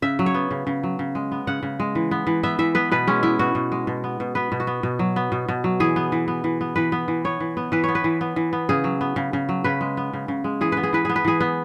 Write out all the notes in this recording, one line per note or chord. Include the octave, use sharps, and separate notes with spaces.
C#3 E5
F#3
C#5
B3
C#3
C#3
F#3
C#3
G#3
B3
C#3 F#5
C#3
G#3
E3
B3
E3
B3 E5
E3 E5
B3 B4
B2 B4
G#3 C#4
B3 E4
B2 F#4
B2
G#3
B2
B3
B2
B3 B4
B2
F#4
B3
B2
F#3
B3
B2
B2
F#3
E3 G#4
B3
E3
B3
E3
B3
E3 B4
B3
E3
B3 C#5
E3
B3
E3 B4
B3 C#5
B4
E3
B3
E3
B3
C#3 G#4
F#3
B3
C#3
C#3
F#3
C#3 B4
G#3
B3
C#3
C#3
G#3
E3 G#4
B3 B4
G#4
E3 B4
B3 G#4
B4
E3 G#4
B3